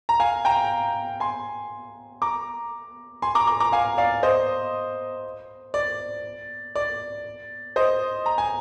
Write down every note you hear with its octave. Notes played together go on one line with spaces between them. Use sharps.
A#5
F5 G#5
G5 A#5
G#5 C6
A#5 D6
G#5 C6
A#5 D6
A#5 D6
A#5 D6
F5 G#5
D5 F5
C5 D#5
D5
D5
C5 D#5
A#5
G#5